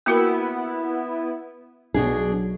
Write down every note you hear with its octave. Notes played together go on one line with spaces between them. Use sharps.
A#3 B3 E4 F#4 A#4
B1 B2 D4 G#4